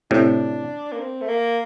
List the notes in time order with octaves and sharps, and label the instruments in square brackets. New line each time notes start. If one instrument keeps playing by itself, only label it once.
[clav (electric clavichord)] A2 C3 [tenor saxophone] D4
[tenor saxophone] A#3
C4
A3
A#3